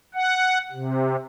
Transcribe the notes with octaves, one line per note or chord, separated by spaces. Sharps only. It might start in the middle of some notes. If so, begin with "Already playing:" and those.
F#5
C3